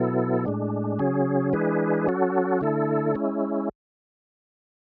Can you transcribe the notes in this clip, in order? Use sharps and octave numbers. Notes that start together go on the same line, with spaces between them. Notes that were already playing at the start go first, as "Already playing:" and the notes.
Already playing: B2 F#3 B3 E4 A4
A2 G#3 D4
C#3 F#3 C#4 G#4
E3 G#3 D4 G#4 B4
F#3 C#4 F#4 A4
D3 A3 E4 A4
G#3 C#4 E4